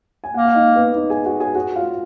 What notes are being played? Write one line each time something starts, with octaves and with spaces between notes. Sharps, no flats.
G#5
A#3 F#5
F5
D#4 D#5
B3 B4
D#4 D#5
G#4 G#5
F#4 F#5
G#4 G#5
F#4 F#5
F4 F5